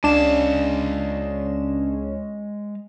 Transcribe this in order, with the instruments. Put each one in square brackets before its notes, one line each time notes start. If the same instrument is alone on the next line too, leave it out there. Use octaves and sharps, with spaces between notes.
[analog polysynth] C#2 C#4 [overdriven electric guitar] G#3 F5 [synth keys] D4 E7